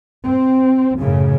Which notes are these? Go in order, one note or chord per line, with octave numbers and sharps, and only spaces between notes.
C4
F#2 A2 C#3